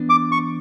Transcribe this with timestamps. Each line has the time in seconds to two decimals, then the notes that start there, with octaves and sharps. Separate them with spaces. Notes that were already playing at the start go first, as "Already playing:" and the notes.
Already playing: E3 B3 D4
0.10 D6
0.32 C#6